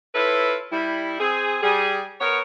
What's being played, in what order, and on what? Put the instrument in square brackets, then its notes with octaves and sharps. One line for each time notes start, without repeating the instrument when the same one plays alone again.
[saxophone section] E4 F4 A4 B4 C#5
G3 E4
C4 G#4
G3 G#4
B3 A#4 C#5